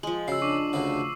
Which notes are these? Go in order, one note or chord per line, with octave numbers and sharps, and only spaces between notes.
F3 G#3 F#7
C#3 F#4 E6 C7
D4 C#6 D6 C7
D2 C#3